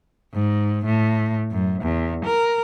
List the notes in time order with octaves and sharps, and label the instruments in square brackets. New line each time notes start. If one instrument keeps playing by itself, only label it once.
[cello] G#2
A2
F#2
E2
A#4